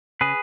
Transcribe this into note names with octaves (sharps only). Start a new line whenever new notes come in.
C#3 G#4 B4